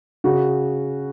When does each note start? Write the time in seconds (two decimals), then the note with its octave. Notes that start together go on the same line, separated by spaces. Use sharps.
0.24 C#3 F#4